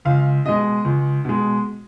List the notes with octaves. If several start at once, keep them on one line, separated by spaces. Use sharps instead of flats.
C#2 F5
B2 G#3 D#5
C#2
B2 G#3